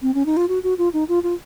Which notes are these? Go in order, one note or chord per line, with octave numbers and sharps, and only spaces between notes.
C4
C#4
D#4
F4
F#4
F#4
F4
D#4
F4
F4